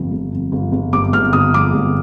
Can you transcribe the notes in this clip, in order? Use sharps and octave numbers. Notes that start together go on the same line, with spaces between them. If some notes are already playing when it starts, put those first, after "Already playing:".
Already playing: G1 F2
G1
F2
G1
G1
G1 D6
G1 F6
G1 D#6
F2 D6
G1